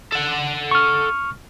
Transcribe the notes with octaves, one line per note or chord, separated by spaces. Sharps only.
A4 F#5
C#6 F6